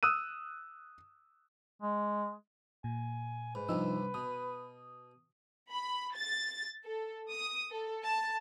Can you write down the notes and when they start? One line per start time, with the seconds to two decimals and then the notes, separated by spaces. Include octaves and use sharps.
0.03 D#6 E6 F#6 D#7
1.82 G#3
2.84 A#2 G#5
3.55 G#2 B4
3.69 C2 G2 C3 F3 D#4 E6
4.14 B2 D#6
5.70 B5
6.15 A6
6.84 A4
7.30 D#6
7.71 A4
8.04 A5